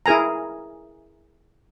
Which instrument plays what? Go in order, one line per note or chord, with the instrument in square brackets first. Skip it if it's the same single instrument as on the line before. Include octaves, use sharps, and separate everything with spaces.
[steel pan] E4 G#4 A#4 G#5 A#5